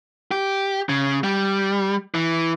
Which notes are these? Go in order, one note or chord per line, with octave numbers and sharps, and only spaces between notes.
G4
C#3
G3
E3